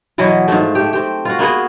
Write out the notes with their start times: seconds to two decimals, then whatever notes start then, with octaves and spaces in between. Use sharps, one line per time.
0.18 B2 E3 F#3 D#5
0.48 G#2 F3 A3
0.75 A3 G4
0.93 C4 G4
1.25 F4 F#4
1.39 A#3 B3 F#4 G#4